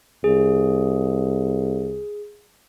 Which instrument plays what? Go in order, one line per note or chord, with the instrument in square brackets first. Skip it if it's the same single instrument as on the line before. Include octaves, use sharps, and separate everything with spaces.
[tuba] C2 [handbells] G#4